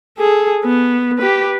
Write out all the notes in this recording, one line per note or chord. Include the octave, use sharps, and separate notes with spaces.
G#4 A4
B3
G4 B4